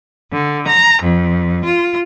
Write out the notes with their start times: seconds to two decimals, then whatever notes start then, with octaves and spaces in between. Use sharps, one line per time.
0.32 D3
0.67 A#5
1.02 F2
1.64 F4